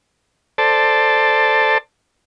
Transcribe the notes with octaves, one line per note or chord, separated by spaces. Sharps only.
A4 C5 D5 A5